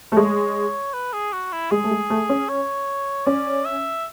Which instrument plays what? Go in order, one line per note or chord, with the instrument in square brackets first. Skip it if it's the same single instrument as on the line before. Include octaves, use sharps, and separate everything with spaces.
[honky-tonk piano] A3
[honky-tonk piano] G#3 [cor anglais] C#5
[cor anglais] B4
G#4
F#4
E4
[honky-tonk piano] G#3 [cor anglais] G#4
[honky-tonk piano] A3
G#3
A3
C#4
[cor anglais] C#5
[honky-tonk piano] C#4 [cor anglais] D5
[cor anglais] E5